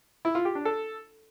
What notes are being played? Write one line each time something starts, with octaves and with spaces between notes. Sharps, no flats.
E4
F4
G4
D4
A4